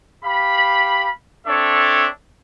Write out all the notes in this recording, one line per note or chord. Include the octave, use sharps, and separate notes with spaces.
G4 F5 B5
C4 D4 A4 C#5 E5